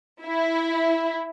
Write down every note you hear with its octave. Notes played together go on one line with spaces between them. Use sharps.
E4